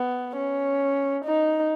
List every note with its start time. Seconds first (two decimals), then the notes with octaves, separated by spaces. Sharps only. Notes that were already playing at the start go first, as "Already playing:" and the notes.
Already playing: B3
0.37 C#4
1.25 D#4